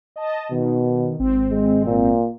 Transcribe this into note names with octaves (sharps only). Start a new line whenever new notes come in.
D#5 A5
B2 D#3
G#1 C4
G#3
A#2